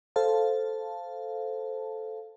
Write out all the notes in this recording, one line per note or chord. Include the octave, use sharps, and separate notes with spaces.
A4 C5 F5 A5